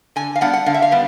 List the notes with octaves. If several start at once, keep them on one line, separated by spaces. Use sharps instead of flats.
D3 G#5
F5
G3 B3 D4 F#5
F#5
D3 F5
E5
F5
G3 B3 D4